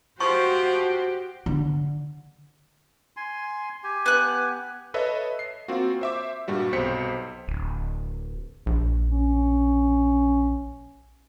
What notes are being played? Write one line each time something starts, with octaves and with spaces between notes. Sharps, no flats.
F3 F#4 G4 C5 C#6
D3
G#5 C6
G4 G#5
B3 F#6
A4 B4 C#5 D#5 E5
C7
A#3 C4 F4 F#4
C5 E5 D6
G2 A#2 G3 F#4
B1 C3 G4 C5 B6 C#7
D1
A#1
C#4